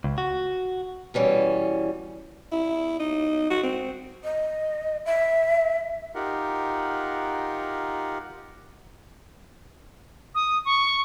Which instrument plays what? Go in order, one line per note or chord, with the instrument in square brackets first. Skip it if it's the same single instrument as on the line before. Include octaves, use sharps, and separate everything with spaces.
[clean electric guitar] C#2
F#4
[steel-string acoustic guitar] B2 E3 G3 C#4
[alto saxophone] E4
D#4
F#4
C4
[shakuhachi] D#5
E5
[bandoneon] D#4 F4 G4 A#4 F#5
[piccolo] D#6
C#6